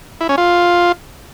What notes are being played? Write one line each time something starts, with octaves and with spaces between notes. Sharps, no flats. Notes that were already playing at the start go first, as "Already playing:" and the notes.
E4
C#4
F4